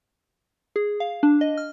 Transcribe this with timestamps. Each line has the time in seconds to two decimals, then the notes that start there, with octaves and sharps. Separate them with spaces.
0.76 G#4
1.00 F5
1.23 D4
1.41 D#5
1.57 F6